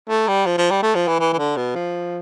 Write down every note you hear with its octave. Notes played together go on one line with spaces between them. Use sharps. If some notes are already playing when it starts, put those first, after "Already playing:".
A3
G3
F3
F3
G3
A3
F3
E3
E3
E3
D3
B2
F3